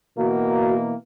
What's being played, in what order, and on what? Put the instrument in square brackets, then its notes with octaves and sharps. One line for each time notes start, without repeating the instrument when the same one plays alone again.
[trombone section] B2 E3 A#3 [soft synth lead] F#4